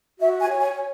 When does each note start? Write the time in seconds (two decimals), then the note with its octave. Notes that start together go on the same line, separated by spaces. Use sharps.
0.19 F#4 E5
0.39 G#5
0.49 C#5
0.59 G#5